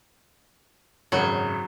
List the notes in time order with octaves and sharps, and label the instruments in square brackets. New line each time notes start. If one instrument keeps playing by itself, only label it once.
[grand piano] G#1 F#2 C#3 [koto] F#3